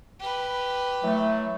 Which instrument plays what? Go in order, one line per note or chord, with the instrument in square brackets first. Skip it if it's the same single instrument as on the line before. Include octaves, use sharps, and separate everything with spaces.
[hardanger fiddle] G4 B4
[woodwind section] E3 F#3 A3